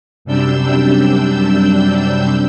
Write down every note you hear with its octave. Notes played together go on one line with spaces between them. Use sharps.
F#2 C3 G3 D4 E6 G6